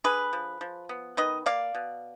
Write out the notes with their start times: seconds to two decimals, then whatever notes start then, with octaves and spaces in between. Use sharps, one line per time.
0.04 D3 G#4 B4
0.33 F3
0.61 F3
0.89 B3
1.17 D#3 B4 D#5
1.46 A#3 D5 F5
1.75 B2